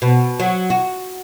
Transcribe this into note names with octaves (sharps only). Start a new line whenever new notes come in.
B2
F#3
F#4